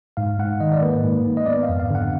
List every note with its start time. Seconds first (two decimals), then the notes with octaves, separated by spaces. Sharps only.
0.17 G#2 F5
0.39 G#2 F#5
0.60 D#3 D#5
0.72 D5
0.82 A#3 B4
1.04 G#2
1.25 G#2
1.37 D#5
1.46 B3 D5
1.63 F5
1.69 F2
1.80 F5
1.90 D3 F#5